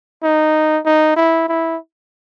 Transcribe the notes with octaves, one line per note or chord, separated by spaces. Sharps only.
D#4
D#4
E4
E4